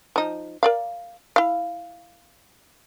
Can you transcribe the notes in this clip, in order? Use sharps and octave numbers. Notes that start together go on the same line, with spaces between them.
F3 D#4
A#4 D5 F5
E4 F5